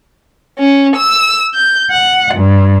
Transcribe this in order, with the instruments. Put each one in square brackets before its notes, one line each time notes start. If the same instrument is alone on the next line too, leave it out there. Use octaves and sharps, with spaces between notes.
[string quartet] C#4
E6
G6
F#5
G2